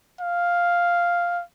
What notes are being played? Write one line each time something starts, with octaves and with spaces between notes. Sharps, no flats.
F5